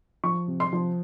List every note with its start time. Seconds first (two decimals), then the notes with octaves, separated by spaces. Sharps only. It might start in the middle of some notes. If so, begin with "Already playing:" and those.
0.24 F3 C#6
0.48 C3
0.60 C6
0.73 F3